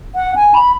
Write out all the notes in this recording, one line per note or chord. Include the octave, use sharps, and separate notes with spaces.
F#5
G#5
B5